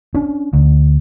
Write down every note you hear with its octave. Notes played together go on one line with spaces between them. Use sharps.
C#4 D4
D2